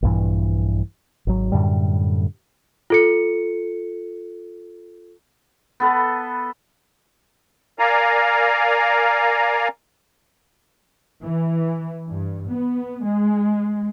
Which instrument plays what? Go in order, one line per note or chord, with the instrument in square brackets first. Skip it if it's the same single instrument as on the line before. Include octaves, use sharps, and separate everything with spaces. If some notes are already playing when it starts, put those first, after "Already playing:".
[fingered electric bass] A#1 G2 E3
G#1 F#3
F#2 A2 D3 G3
[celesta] F4 A4 C#7
[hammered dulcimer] B3 A4 B4
[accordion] A#4 D5 F5 G#5 A#5
[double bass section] E3
G2
B3
G#3